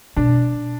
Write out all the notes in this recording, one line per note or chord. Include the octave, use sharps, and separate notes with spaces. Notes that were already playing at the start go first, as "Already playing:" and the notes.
B2 D4